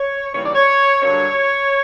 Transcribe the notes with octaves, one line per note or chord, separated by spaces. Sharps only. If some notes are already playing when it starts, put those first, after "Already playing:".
Already playing: C#5
D#2 C#3 E3 G3 A#3 C#5
D5
C#5
G2 D3 F#3 A#3 C#5